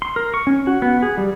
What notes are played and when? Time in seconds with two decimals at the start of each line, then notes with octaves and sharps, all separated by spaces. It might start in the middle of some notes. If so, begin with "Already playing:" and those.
0.02 C6
0.16 A#4
0.34 C#6
0.47 C#4
0.67 F#4
0.82 B3
1.02 G#4
1.18 G3